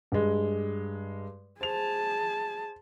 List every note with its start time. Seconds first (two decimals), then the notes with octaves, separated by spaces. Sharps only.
0.12 G2 G#3
1.61 G#4 C5 A5 F7